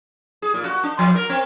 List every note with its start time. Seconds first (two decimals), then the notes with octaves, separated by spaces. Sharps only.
0.42 G#4
0.54 A#2
0.65 F#4
0.83 D4
0.99 F3
1.15 A#4
1.30 C4